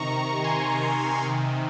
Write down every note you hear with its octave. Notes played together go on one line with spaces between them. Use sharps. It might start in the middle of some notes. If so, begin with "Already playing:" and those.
Already playing: C3 D#3 A#5 C#6
G#5 C6
C3 D#3